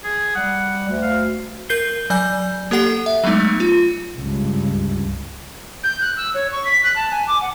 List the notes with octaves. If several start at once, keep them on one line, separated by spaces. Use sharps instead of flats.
G#4
G3 F#5
D2
F5
A#4 G6 C7 G7
F#3 D5 G#5 G6
A#3 G4 A4 F#5 C7
E5
F#3 G#3 A3 B3 D#4
F4
C#2 G2
G6
F#6
E6
C#5
C#6
B6
F#6
A5
G#5
D6
F#5